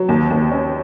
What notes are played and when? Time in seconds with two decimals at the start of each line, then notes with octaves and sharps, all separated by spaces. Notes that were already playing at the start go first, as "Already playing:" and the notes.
Already playing: F#3
0.09 D#2
0.30 D#2
0.52 C#4